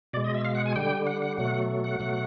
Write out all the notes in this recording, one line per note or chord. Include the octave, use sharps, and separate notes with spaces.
B2 G#3 D5
D#5
E5
F5
F#5
G#5
D3 G3 G5
F#5
F#5
B2 F#3 A3 F#5
F#5
B2 F#3 A3